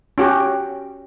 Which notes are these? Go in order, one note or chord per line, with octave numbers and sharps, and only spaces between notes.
C#4 F#4 G4